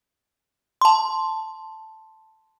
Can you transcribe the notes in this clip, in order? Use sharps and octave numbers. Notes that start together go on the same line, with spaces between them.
A5 C6